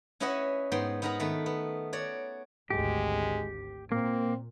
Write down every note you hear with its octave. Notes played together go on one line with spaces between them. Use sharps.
C#4 E4 B4 D#5 E5 F#5
G#2 B3 G5 C6
B3 D#4 A#4 B4 F#5 A#5
D#3 A3 B3 B4
B3
F#4 C#5 D5
G#1 D2 G#3 G4
A#2 A#3 C4